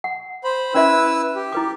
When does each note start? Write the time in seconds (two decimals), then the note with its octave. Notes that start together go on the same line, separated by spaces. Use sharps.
0.04 F#5
0.44 C5 B5
0.75 C#4 E4 B4 D5 E5 E6
1.35 G4
1.53 E4 B4 D6